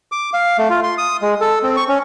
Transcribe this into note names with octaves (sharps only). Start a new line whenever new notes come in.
D6
F5
A3
F4
C6
D#6
G#3
A4
C4
C#6
C#4